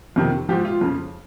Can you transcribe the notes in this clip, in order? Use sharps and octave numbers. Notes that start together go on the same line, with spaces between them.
F2 C3 D#3
G#2 F3 G4
F4
F2 C#3 F3